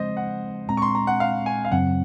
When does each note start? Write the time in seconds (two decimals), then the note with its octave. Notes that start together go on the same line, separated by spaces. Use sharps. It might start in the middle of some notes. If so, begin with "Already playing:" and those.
Already playing: C#3 F3 G#3 C4 C5 D#5
0.17 F#5
0.69 A#2 G#3 C4 A#5
0.77 C#6
0.82 C6
0.95 A#5
1.07 F#5
1.20 F5
1.46 G#5
1.65 F5
1.71 F#2 C#3 F#3 C4 F#5